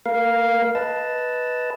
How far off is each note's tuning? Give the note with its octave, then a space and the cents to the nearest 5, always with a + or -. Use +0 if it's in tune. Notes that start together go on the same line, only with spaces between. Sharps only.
A#3 -30 A#4 +40 F5 +0
B4 +0 D#5 +20 A5 +0